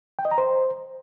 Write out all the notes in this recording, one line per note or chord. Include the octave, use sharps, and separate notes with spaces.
G5
D#5
A#5
C5